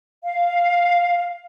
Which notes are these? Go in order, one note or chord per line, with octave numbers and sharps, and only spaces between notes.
F5